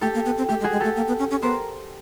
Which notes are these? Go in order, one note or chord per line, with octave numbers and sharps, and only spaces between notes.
A3 G4 A4
A#3
B3
C4
A3 G4
G#3
F#4 G#4
G#3
A3 G4 A4
A#3
B3
C#4
C#4
B3 A#4 C5